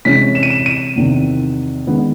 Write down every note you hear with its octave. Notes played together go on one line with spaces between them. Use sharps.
C3 E3 G#3 C#4 B6
E7
D#7
E7
D#7
E2 C3 D#3
D#3 G#3 B3